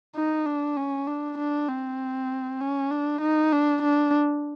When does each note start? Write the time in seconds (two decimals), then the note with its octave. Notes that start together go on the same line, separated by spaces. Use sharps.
0.16 D#4
0.46 D4
0.77 C#4
1.08 D4
1.38 D4
1.69 C4
2.61 C#4
2.91 D4
3.22 D#4
3.52 D4
3.83 D4